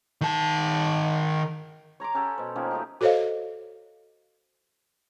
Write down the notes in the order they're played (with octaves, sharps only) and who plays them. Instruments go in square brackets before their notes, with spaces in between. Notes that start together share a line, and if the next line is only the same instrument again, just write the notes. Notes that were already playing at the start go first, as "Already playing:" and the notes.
[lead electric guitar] D#3 A5
[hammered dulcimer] C#5 A#5 C6 D6
C#4 G4 A4 F#5
B2 C5
D#3 F3 A#3 C#4
A3 D#4 G4
[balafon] F#4 A4 C5 C#5 D#5 F5